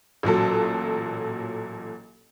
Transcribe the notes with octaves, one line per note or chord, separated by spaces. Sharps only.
A1 A#2 F#3 A4